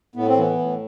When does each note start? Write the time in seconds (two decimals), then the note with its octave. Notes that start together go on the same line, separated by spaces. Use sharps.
0.15 A2 B3
0.27 C4
0.37 E3 B3
0.58 A2